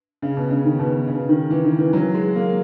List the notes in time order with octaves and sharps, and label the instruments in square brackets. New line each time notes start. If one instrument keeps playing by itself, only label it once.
[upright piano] C#3
B2
C#3
D#3
B2
C#3
D#3
E3
D#3
E3
F#3
G#3
A#3